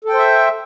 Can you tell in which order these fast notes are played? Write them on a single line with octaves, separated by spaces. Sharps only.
A4 G5 C5 E5